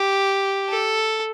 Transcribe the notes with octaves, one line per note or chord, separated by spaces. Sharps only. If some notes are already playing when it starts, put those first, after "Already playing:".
Already playing: G4
A4